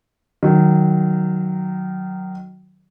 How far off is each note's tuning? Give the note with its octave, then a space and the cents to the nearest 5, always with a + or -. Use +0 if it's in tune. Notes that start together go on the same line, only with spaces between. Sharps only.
D#3 -15 F#3 +0